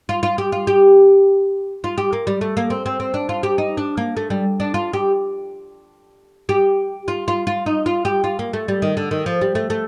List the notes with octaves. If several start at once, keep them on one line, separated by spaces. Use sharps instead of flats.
F4
F4
G4
F4
G4
F4
G4
A#3
G3
A3
A#3
C4
C4
C4
D4
F4
G4
D#4
D4
A#3
A3
G3
D4
F4
G4
G4
F4
F4
F4
D#4
F4
G4
F4
A#3
A3
G3
D#3
D3
D#3
F3
G3
A3
A3